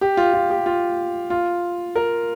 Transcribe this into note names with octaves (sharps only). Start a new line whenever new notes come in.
G4
F4
F4
G4
F4
F4
A#4